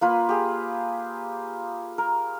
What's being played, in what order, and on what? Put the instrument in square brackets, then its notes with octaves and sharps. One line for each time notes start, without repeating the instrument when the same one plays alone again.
[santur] A#3 F4 B4
G4 G#4
A#4